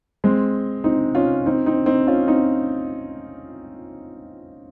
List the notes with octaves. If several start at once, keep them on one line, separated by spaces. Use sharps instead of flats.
G#3 C4
C4 D#4
C#4 F4
C4 D#4
C4 D#4
C4 D#4
C#4 F4
C4 D#4